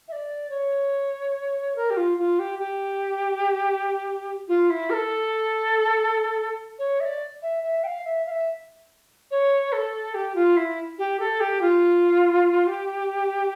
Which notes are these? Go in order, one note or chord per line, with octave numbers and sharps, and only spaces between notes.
E5
D5
C#5
A#4
G4
F4
F4
G4
G4
F4
E4
A#4
A4
C#5
E5
D5
E5
E5
G5
F5
E5
F5
E5
C#5
A4
G4
F4
E4
G4
A4
G4
F4
G4